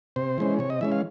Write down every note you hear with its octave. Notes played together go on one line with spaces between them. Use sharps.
C3 C5
E3 G#3 C#4
C3 C#5
D#5
E3 G#3 C#4 E5
F5